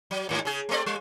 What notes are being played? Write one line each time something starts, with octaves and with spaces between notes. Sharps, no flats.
F#3
D#2 G#2
C#3 G#4
A3 C4 D5
G3